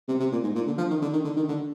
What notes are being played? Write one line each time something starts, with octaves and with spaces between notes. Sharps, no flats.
C3
C3
A#2
G#2
A#2
D3
F3
D#3
D3
D#3
D3
D#3
D3